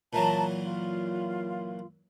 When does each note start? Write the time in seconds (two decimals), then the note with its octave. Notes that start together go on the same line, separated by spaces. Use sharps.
0.13 A#2 E3 F#3 A5 A#5
0.63 F4